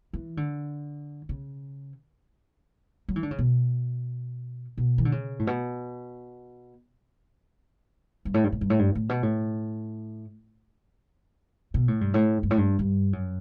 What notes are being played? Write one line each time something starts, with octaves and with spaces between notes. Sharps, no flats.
E3
D3
C#3
F#3
E3
D3
C#3
B2
B2
E3
D3
C#3
A2
B2
G2
A2
G2
A2
G2
A2
G2
A2
B2
A2
B2
A2
G2
A2
G2
A2
G2
G2
F#2